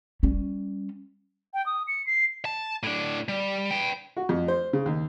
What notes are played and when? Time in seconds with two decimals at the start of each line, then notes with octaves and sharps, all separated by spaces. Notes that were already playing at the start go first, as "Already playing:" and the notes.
0.23 G3 C#4
1.54 G5
1.66 D#6
1.88 C#7
2.06 C7
2.45 A5
2.83 A2 D4
3.28 G3
3.71 B4 G5
4.16 F#4
4.29 F2
4.48 C5
4.73 C#3
4.86 D#2